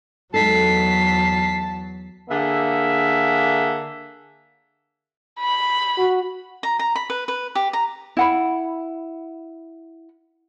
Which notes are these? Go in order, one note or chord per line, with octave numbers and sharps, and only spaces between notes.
E2 F#3 G#3 D#4 A4 A5 B6 C7
D3 A#3 G#4 E5
B5
F#4
A#5
A#5
B5
B4
B4
G4
A#5
E4 F#5 B5